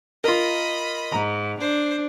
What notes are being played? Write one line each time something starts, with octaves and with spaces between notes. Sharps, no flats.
F4 A#4 D#5 B5
G#2 A#5
D4 C5